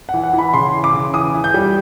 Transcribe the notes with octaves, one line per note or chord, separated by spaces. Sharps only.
E3 F#5
F#5
E3
B5
C#3 C6
E3
D6
C#3
E3 D#6
E3
G6
G3